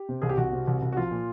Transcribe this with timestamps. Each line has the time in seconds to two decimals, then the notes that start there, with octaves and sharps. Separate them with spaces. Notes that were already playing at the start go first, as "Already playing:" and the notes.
Already playing: G4
0.09 C3
0.22 C2 G#4
0.29 G4
0.37 C2 F#4
0.52 C3
0.67 C2
0.82 C2
0.92 F#4
0.97 F3 F4
1.11 A#2